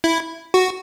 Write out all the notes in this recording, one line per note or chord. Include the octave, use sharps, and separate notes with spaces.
E4
F#4